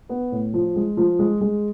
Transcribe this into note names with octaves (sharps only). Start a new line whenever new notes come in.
B3
A2
F3
G#3
F3
G#3
G#3